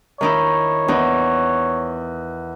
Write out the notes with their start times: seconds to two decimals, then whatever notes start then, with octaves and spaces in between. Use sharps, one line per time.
0.21 D#3 D#4 E4 C#5
0.88 E2 D#4